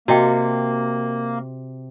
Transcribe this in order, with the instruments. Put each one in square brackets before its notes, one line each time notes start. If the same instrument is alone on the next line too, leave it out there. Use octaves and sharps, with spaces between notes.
[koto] C3 [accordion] A#3 [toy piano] F#4 D#5 G5